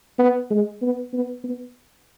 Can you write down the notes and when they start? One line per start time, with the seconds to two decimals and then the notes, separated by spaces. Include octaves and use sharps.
0.19 B3
0.50 G#3
0.82 B3
1.13 B3
1.44 B3